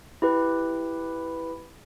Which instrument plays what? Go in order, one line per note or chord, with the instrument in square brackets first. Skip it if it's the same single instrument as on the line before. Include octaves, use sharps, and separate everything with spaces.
[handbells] E4 G4 B4